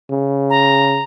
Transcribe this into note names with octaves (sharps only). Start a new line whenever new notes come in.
C#3
A#5